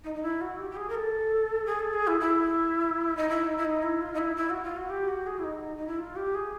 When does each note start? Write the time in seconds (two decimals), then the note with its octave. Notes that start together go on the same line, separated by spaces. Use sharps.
0.04 D#4
0.15 D#4
0.23 E4
0.41 F#4
0.59 G4
0.71 G4
0.77 G#4
0.89 A#4
0.95 A4
1.66 G#4
1.79 A4
1.93 G#4
2.07 E4
2.20 E4
3.17 D#4
3.29 E4
3.47 D#4
3.58 E4
3.65 D#4
3.83 E4
4.01 F4
4.14 D#4
4.18 E4
4.36 E4
4.50 F#4
4.63 F4
4.77 F#4
4.90 G4
5.08 F#4
5.26 G#4
5.38 E4
5.44 D#4
5.77 D#4
5.87 E4
5.99 F4
6.16 G4
6.35 G#4